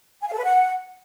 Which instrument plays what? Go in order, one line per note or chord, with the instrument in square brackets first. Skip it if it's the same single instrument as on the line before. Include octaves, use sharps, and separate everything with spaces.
[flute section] G#5
F5
A4
B4
F#5